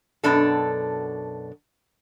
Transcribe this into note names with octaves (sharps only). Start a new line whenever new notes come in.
F#2 B2 D4 A4